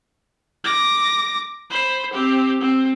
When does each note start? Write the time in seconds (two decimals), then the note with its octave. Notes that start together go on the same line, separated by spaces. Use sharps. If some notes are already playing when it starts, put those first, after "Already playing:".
0.64 D6 A#6
1.70 C5 B5
2.13 C4 G4
2.61 C4